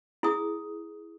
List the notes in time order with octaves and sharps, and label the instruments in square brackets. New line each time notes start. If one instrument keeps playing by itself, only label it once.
[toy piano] E4 G#4 D#6